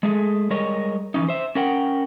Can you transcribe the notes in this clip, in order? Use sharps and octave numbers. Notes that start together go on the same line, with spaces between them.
G#3 A3 G#4
G3 G#3 A#4 C#5 D#5
E3 F3 C#4 D#4
C5 E5
C#4 A#4 F#5 G5